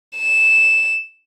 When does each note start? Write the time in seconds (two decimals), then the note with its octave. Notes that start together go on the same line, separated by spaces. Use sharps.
0.17 E7